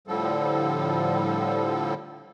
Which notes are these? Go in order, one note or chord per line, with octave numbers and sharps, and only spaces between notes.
A2 D3 F3 G3 A4